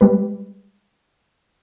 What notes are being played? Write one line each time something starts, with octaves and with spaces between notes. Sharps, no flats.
G3 G#3 B4